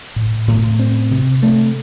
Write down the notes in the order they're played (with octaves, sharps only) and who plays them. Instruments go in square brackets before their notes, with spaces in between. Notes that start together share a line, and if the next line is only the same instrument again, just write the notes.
[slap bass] A2
A2
C4
C3
A3